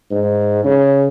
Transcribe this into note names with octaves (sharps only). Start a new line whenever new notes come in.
G#2
C#3